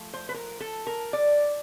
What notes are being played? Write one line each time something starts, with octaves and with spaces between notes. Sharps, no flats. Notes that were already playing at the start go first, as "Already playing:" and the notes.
Already playing: F3 A3
C5
B4
A#4
A4
A#4
D5